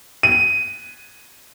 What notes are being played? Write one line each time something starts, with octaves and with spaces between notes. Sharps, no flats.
D#7